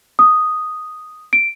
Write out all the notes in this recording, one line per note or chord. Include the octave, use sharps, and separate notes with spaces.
D#6
D7